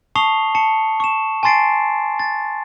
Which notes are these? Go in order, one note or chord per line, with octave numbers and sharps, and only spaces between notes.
A5 C#6 D#6 C7 F7 G7
A5 C#7
C#6 E7
G#5 A5 C6 A6 C7 D7
A6